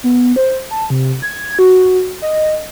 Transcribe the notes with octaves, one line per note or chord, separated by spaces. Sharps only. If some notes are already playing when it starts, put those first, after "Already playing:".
B3
C5
A5
C3
G#6
F#4
D#5